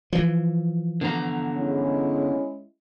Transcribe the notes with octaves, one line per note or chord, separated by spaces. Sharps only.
E3 F3
D3 B3 A#5
G#3 C#4 E4